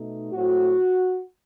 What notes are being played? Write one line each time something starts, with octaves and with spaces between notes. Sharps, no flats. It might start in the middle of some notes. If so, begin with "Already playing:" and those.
Already playing: B2 A3 D#4
A2 F#3 A3 C4 F#4